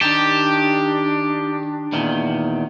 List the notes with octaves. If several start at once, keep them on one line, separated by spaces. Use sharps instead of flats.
D#3 D4 G4 A5
E2 A#2 D#3